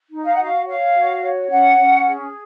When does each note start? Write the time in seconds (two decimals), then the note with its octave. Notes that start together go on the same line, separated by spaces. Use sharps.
0.11 D#4
0.24 F5
0.33 F#5
0.39 F#4 F5
0.66 C#5 F5
0.95 F#4
1.22 C#5
1.50 C#4 F#5
1.78 C#4
2.06 G#4